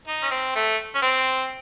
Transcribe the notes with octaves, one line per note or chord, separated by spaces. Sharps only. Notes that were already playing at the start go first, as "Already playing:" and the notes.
D#4
C#4
C4
A3
C#4
C4